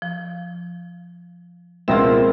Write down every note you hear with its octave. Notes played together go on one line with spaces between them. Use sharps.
F3
C#2 B2 F3 C4 F4 G#4 A#4 E5